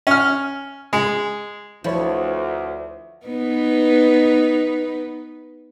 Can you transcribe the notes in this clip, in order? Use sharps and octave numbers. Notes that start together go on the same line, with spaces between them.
C#4 F6
G#3
D2 F3 E4 B4 C#5
B3 D#4 B4